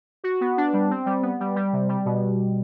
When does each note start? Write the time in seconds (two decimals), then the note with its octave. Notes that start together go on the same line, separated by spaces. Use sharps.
0.24 F#4
0.41 B3
0.57 D4
0.73 G3
0.91 C4
1.06 G3
1.23 B3
1.40 G3
1.56 G3
1.73 C3
1.89 G3
2.06 B2